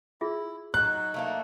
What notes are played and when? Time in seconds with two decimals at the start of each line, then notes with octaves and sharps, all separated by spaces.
0.21 E4 F4 G#4 E5
0.74 F#3 D#4 F#4 F#6
1.14 A3 A#3 D4